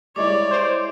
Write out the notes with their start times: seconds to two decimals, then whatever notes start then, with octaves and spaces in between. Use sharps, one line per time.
0.16 G3 G#3 E4 C#5 D5 D6
0.51 C5 G6 D7